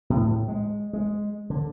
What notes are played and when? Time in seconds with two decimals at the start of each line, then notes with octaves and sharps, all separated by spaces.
0.10 A2
0.48 G#3
0.93 G#3
1.50 D3